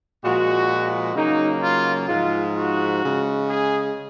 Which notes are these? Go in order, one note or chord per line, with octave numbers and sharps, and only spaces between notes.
A#2 F3 G#3 F#4
C#3 F#3 A#3 D#4
F4
G#2 F3 G#3 F4
F#4
C#3 G#3
G#4